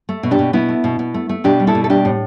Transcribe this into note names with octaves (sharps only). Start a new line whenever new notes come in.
A3
B2
D4 G4
B2
B2 B3 E4
A3
B2
B2
A3
A3
B2 D4 G4
G3
E4 A4
B2
A4
G3 D4 G4
A2